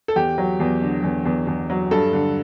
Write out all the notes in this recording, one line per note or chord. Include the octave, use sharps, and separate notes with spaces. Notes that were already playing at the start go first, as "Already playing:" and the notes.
A4
E2 G4
F#3
E2
D3
E2
E2
E2
F#3
G2 A4
D3